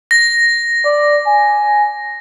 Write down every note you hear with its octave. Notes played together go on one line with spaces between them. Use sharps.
A#6
D5
G#5